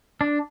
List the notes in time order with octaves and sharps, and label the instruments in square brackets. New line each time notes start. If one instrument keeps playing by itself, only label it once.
[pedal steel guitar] D4